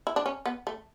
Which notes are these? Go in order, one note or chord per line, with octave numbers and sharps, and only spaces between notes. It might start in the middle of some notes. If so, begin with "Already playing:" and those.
E4
D4
C#4
B3
A3